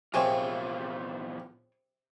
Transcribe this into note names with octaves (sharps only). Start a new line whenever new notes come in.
A#1 E2 C3 F4 G#4 C5 C#5 G5